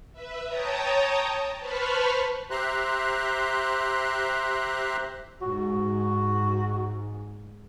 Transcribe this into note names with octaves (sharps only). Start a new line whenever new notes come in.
B4 E5
C#5 G5 A5 A#5 D#6
B4 C5 A5 B5 C#6 F6
G4 C5 E5 A#5 C6 F#6
G#2 F#4